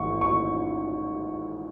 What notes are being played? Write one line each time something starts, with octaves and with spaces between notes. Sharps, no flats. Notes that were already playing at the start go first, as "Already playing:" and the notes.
Already playing: A1 G#2 C#6
C#6